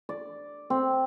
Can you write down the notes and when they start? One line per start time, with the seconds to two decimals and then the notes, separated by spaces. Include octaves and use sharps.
0.09 D5
0.70 C4